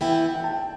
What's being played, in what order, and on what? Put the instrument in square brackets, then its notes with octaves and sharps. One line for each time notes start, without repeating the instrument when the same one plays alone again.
[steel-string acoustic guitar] E3 B3 E4 G4 [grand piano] G5
[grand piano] G5
A5
G5